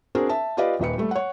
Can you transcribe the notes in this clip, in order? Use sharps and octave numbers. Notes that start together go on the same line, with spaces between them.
C4 D4 F#4 G#4 A#4
E5 A5
F4 G4 B4 D5 D#5 F5
D#1 D#3 D#4 B4 C#7
G3 A3
C#5 F#5